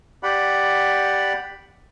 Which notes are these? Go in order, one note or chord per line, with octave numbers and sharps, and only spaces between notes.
G4 D5 F#5 B5